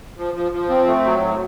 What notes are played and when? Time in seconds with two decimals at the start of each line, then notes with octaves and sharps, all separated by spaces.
0.17 F3
0.34 F3
0.52 F3
0.69 C4
0.87 A3
1.04 F#3
1.21 A2